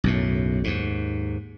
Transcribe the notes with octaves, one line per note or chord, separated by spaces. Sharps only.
B1 F#2 A2
D#2 G#2